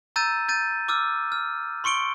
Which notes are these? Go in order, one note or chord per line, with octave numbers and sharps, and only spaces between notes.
A#5 E6 G6 A6 D#7
G6 A6 D#7
D6 E6 F6
F6
C6 C#6 C#7 D7 G7